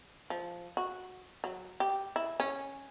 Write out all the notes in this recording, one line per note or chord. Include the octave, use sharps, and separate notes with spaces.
F3
F#4
F#3
G4
E4
C#4